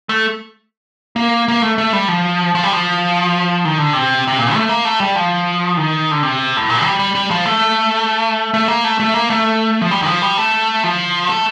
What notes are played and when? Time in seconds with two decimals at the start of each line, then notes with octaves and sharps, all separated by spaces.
0.09 A3
1.16 A#3
1.48 A#3
1.62 A3
1.78 A3
1.93 G3
2.08 F3
2.55 F3
2.63 G3
2.73 F3
3.65 D#3
3.78 D3
3.93 C3
4.27 C3
4.39 A#2
4.54 A3
4.69 A#3
4.85 A3
5.00 G3
5.16 F3
5.77 D#3
6.11 D3
6.23 C3
6.57 A2
6.69 A#2
6.84 G3
6.99 G3
7.15 G3
7.31 F3
7.46 A3
8.54 A3
8.68 A#3
8.84 A3
9.00 A3
9.14 A#3
9.30 A3
9.81 F3
9.91 G3
10.02 D#3
10.07 F3
10.22 G3
10.37 A3
10.84 F3
11.29 A3